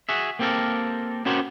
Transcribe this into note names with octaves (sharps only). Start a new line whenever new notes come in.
F#4 G#4 E5
A#3 C4 G4 A4 A#4
B3 C#4 F#4 G4 A#4 C5